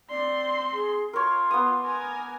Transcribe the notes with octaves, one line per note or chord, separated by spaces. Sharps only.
C4 D5 C6
G#4
F4 A#4 C#5 C6
B3 D6 D#6
A#4 G#5